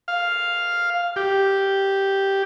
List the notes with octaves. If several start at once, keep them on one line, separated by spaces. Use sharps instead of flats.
F5
G4